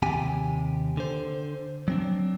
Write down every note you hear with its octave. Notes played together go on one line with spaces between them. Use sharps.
D#2 C3 G4 G#5
D3 C5
F#3 C4 D4